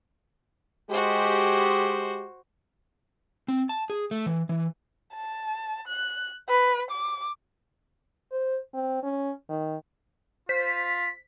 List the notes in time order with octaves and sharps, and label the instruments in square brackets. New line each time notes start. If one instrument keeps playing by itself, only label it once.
[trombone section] G#3 G4 [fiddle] F#4 C5
[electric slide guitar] C4
A5
G#4
A3
E3
E3
[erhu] A5
F#6
B4
D6
[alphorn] C5
C4
C#4
D#3
[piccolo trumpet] F4 [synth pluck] C5 [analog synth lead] B6